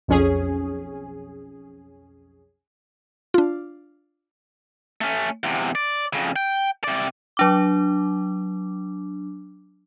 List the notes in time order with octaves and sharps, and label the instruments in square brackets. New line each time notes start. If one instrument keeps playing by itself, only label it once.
[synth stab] B1 F2 C#4 G#4
[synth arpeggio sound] D4 F4
[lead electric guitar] A3 C#4
E2 C3
D5
F2 C#3
G5
C3 D5
[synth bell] F#3 D4 D6